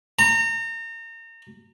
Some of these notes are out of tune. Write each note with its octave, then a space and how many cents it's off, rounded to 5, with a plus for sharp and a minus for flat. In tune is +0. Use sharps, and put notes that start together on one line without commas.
A#5 -35